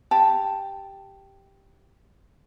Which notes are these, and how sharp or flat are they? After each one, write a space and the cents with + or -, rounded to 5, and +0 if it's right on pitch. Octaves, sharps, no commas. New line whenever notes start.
G4 +0 A5 +0